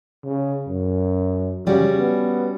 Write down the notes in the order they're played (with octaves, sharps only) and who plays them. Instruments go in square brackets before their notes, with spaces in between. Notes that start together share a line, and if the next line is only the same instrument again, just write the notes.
[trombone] C#3
F#2
[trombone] C#3 [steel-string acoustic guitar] G3 C#4 F#4
[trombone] B3